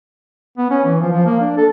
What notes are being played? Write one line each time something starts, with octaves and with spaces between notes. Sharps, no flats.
B3
C#4
E3
F3
F3
A#3
D4
A4